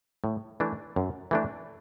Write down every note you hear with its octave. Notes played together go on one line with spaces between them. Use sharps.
A2
E3 A3 D4
F#2
E3 A3 D4